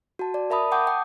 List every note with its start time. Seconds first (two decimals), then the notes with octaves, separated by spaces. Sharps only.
0.19 F#4 A5
0.34 D5
0.50 A#4 E5 A5 B5 D#6
0.71 F#5 G5 A5 D6 D#6 G6
0.87 G5